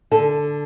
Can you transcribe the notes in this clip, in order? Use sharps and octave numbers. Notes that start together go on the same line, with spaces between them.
D3 A4